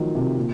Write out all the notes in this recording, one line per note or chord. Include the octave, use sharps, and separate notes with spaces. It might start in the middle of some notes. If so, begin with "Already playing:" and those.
Already playing: D#3 F3 F#3 A3
C3
A#2